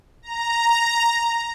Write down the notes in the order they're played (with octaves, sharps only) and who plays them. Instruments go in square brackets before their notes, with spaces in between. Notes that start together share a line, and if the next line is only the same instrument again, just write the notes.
[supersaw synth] A#5